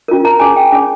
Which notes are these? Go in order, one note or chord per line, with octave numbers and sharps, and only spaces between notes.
C#4 F4 A#4
A#5
C#4 G#4 C#5 G#5
G5
C#4 G#4 C#5 G#5